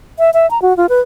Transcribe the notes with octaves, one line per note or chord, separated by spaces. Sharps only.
E5
E5
A#5
F#4
F4
B4